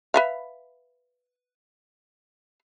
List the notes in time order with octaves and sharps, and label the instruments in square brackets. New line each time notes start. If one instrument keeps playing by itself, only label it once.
[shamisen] B4 E5 F5